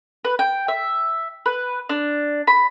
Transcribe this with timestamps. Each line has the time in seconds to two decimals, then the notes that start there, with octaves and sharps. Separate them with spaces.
0.24 B4
0.39 G5
0.68 E5
1.46 B4
1.89 D4
2.47 B5